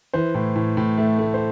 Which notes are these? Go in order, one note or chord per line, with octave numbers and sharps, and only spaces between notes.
E3 C5
A2
A2
A2
A3
A3
C5